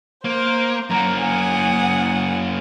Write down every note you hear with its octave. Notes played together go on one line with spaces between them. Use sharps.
A#3 C5
F#2 A#3 F#5 A#5
F#5 G#5 D#6